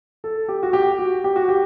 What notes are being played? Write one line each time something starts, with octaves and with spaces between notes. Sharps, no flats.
A4
G4
F#4
G4
F#4
G4
F#4
G4